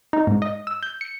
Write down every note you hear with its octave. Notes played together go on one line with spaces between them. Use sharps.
D#4
G#2
D#5
E6
G6
C#7